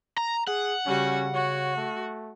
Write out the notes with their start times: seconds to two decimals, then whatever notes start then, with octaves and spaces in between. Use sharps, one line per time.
0.18 A#5
0.47 G#4 F#5
0.86 C#3 G3 C#4 F#4
1.34 F#4 C#5
1.76 A3